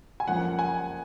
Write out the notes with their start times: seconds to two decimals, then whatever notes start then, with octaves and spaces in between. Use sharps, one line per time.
0.20 G#5
0.27 F#1 F2 C#3 F3 A#3 F#5
0.59 G#5